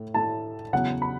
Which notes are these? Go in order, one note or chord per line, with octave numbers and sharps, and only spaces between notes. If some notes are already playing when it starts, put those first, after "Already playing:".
Already playing: A2 A3
A2 A3 E4 A5
E2 C#3 F#3 F#5
B5